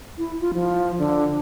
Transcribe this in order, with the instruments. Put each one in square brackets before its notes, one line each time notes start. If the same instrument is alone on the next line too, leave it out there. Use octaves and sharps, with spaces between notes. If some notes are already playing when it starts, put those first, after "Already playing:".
[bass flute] E4
F4
F3
D3